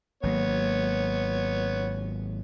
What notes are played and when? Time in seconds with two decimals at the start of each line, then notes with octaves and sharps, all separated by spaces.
0.23 G#1 F#3 A#3 B3 C#5